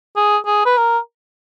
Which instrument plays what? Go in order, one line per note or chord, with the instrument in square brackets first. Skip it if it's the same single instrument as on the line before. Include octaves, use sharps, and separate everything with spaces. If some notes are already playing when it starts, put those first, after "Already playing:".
[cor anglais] G#4
G#4
B4
A#4